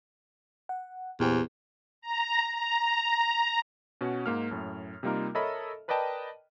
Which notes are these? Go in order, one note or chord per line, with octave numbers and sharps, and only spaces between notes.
F#5
E2 A#2 G4 C5
A#5
A#5
B2 C#4 F#4
G#2 A#3 F6
F#2 A2
C3 G3 A#3 D#4 F4 A#4
A4 A#4 C#5 D#5 E5 B5
A#4 B4 D5 D#5 G5 A5